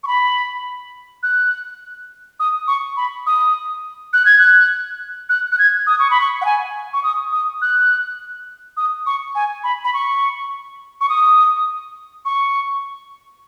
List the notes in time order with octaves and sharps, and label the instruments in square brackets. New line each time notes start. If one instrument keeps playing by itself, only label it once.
[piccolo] C#6
B5
F#6
D#6
C#6
B5
D#6
F#6
G#6
F#6
F#6
F#6
G#6
D#6
C#6
B5
C#6
F#5
G#5
C#6
D#6
D#6
F#6
D#6
C#6
G#5
B5
B5
C#6
C#6
D#6
C#6